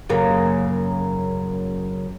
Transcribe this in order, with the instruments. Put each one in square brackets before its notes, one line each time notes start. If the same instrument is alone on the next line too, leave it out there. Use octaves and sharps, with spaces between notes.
[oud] F#2 C#3 A#3